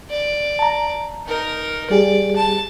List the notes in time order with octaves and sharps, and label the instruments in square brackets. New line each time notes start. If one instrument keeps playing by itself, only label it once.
[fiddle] D5
[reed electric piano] A5 A#5
[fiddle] D#4 A#4
[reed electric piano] G3 G4 G#4 [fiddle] D5
[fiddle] A5